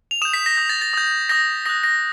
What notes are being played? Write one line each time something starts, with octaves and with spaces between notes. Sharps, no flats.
F7
D#6 G6 E7
B6
A#6
D#6 G6
A6
A6
D#6 G6
D#6 G6 A#6
D#6 F#6 A#6
A#6